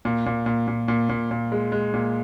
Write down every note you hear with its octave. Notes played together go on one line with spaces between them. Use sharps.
A#2
A#2
A#2
A#2
A#2
A#2
A#2
G#3
G#3
A#2